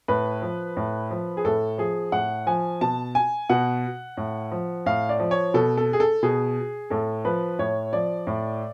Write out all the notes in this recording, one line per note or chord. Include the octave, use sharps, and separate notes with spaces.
A2 B4
F3
A2
F3
G#4
A2 A4
F3 G#4
A2 F#5
F3 G#5
B2 A5
G#5
B2 F#5
A2
F3
A2 F5
D5
F3
C#5
B2 A4
A4
G#4
A4
B2 G#4
A2 A4
F3 B4
A2 C#5
F3 D5
A2